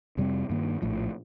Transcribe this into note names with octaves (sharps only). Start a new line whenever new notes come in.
F2 C3 G3 C4
G2 D#3 A#3
A#1 A2 F3